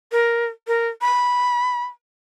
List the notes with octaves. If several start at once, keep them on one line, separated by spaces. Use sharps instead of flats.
A#4
A#4
B5